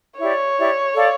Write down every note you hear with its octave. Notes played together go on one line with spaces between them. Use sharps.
E4 G4 C#5 D5
E4 G4 D5
A4 D5 F5